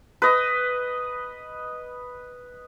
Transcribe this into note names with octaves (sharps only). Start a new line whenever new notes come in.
B4 D#5